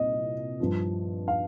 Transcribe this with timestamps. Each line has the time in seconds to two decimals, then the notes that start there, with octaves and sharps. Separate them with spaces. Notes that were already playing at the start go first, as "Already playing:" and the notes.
Already playing: C2 A#2 D#5
0.60 G2 F3
1.28 F5